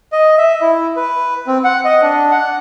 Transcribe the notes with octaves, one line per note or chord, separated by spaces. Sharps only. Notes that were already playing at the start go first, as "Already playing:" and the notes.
D#5
E5
E4
B4
C4
F#5
D#5
D4
F#5